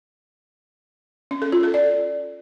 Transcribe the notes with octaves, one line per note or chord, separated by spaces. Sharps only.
C#4
A4
F4
A4
D5